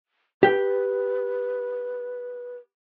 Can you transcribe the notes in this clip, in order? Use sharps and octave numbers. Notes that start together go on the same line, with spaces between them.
G4 B4 G5